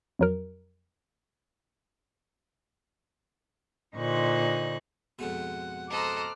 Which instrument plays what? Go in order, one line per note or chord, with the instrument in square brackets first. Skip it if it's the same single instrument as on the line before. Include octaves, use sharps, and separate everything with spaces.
[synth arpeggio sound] F2 F#3 A#4
[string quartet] A#2 D3 D#4 C5 C#6 F#6
[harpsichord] F2 G#2 B2 [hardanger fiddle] F#5
[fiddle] A4 D#5 [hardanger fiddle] C5 A#5 [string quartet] D6 F6 F#6